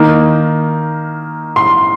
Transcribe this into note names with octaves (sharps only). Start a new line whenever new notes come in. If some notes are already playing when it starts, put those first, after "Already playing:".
Already playing: D#3 A#3 D#4
C6